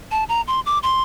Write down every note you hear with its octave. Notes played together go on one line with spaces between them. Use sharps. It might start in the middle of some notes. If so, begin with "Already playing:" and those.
A5
A#5
C6
D6
C6